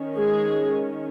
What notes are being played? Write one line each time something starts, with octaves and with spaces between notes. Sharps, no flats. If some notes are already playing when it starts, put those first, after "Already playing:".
Already playing: D#3 C#4
G#3 G#4